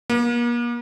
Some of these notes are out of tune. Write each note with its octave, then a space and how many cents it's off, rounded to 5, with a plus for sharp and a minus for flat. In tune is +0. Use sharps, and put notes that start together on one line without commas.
A#3 +40